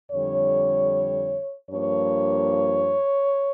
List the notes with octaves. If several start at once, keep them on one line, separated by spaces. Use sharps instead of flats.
F2 D3 G3 C#5
G2 F3 A#3 C#5